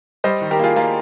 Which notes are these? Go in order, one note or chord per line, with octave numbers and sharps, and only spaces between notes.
G3 C5 D#5
D#3
G4 A#4
A#3 F4 G#4
A#3 F4 G#4